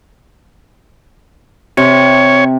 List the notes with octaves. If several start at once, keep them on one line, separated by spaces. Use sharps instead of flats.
C3 C#5